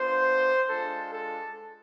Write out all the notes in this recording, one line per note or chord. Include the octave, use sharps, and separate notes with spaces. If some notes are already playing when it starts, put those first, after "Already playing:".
Already playing: B3 D4 F4 C5
G#3 D4 F4 A4
A4